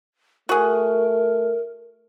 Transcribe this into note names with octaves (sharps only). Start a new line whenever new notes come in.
A3 F#4 G#4 A#4